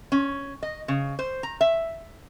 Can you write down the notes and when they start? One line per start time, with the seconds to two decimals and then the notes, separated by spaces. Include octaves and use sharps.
0.12 C#4
0.63 D#5
0.88 C#3
1.19 C5
1.43 A#5
1.61 E5